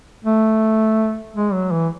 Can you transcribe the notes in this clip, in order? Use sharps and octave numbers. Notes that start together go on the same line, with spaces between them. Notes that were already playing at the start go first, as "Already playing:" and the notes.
A3
G#3
F#3
E3